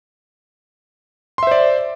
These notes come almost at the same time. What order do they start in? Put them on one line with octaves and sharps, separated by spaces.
C6 E5 C5 D5